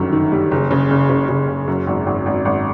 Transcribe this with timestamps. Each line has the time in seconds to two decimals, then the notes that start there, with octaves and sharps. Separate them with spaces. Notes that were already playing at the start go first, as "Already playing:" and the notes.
Already playing: G1 F#2 D#3
0.12 D#3
0.32 G3
0.51 F#1
0.71 C#3
0.90 F#1
1.09 C#3
1.29 C#3
1.48 F#1
1.67 F#2
1.87 G#1
2.06 G#1
2.26 G#1
2.45 G#1